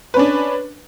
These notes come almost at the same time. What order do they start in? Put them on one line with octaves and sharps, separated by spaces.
B4 C#4 D4